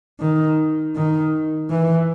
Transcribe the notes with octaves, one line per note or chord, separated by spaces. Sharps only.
D#3
D#3
E3